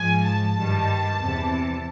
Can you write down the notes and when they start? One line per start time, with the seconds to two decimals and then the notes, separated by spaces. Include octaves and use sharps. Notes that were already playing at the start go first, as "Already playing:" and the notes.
Already playing: G#2 F3 G#5
0.25 A5
0.57 G2 D#3 G3
1.20 E2 C3 E3